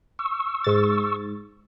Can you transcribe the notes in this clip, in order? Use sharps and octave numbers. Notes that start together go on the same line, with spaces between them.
C#6 E6
G#2 A6